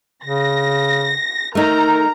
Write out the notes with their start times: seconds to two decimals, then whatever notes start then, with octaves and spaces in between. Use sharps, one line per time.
0.25 C#3 A#6
1.55 A3 D#4 A#4 A#5